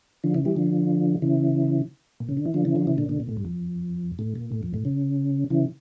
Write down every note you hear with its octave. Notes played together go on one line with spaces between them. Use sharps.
D3 F3
C#3 E3
E3 G3
D3 F3
C#3 E3
A#2
C#3
D3
E3
D3 F3
C#3 E3
D3 F3
C#3 E3
A#2 D3
A#2 D3
A#2
A2
G2
F2
A2
A#2
A2
F2
A2
C#3
C#3 E3